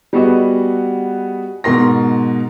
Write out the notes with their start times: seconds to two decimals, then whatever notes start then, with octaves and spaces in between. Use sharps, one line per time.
0.13 G3 B3 F#4 G#4 D#5
1.64 G#2 B2 A#4 C6 A#6